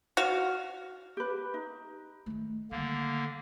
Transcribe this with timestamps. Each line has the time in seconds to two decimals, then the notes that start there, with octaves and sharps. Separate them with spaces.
0.17 F#4 F5
1.17 G4 B4
1.54 D#4
2.26 D#3 A3
2.71 D3 D#3 G3 A#3